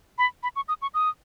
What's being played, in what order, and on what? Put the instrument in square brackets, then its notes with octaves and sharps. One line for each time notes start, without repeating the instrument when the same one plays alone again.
[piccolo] B5
B5
C#6
D#6
C#6
D#6